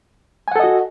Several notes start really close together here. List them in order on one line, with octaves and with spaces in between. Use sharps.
G#5 F#5 A4 D#5 F#4